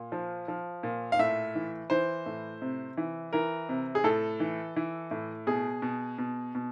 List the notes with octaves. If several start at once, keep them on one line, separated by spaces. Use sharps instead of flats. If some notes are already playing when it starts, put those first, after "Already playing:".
Already playing: A#2
F3
F3
A#2
F5
A2 E5
E3
E3 C5
A2
C3
E3
E3 A#4
C3
G#4
A2 A4
E3
E3
A2
B2 G#4
B2
B2
B2